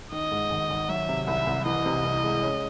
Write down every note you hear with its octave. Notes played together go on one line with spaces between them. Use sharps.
D#3 D#5
G#2
G#1
G#1
F#3 E5
C3
C2 E5
C2
E3 D#5
C3
C2
G#3
C#4